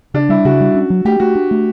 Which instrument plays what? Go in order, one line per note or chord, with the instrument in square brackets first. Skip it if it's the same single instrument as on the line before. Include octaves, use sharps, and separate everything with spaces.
[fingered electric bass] C#3 [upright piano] D4
[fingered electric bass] G3 [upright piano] E4
[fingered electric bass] C#3 [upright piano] F#4
[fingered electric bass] G3
C#4
F#3
[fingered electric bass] A3 [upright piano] G4
[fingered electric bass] A3 [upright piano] F#4
[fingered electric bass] D4
A3